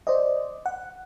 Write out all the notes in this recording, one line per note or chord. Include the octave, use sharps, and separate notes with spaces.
C5 D5 D#5
F#5